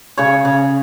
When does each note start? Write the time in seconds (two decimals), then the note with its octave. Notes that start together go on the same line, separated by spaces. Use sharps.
0.18 C#3 C#5
0.45 C#3